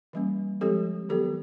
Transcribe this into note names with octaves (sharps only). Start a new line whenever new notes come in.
E3 G3 A#3 C#4
F3 G#3 C4 G4 A4
D#3 F#3 B3 G4 A4